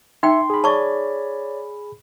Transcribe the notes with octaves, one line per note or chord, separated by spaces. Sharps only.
D#4 E5 G5 C6
G#4 B5
C#5 D5 A5 C#6